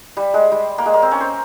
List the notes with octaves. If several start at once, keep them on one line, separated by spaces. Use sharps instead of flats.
G3
G#3
G3
A#3
G#3
A#3
C4
C#4
C5